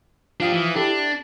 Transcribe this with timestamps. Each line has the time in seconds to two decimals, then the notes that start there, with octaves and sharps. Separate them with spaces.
0.40 F3 D4 G4 F5 D#6
0.53 E3
0.75 D4 E4 G4 A4